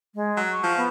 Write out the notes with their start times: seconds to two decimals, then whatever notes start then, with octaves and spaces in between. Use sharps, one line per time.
0.15 G#3
0.37 F#3
0.52 C#6
0.63 F3
0.77 B3